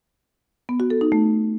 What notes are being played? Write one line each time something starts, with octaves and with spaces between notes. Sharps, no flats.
B3
F#4
A4
D#4
A3